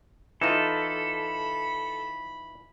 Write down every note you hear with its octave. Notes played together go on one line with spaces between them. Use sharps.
E3 D#4 F4 A4 B5